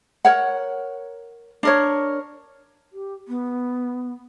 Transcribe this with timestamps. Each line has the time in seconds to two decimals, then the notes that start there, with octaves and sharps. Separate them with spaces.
0.25 A#4 C#5 F#5
1.63 D4 A#4 C#5
2.93 G4
3.28 B3